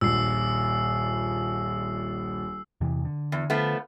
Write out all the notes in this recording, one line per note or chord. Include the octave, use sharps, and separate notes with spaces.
D#1 A#1 E6 C7
E2 C3 E3
D3
E2
F3 A3 B3